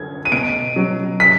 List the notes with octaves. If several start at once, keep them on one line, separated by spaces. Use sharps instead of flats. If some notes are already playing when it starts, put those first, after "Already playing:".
Already playing: F#2 D3 G#6
D#7
B2 D7
F#3
B6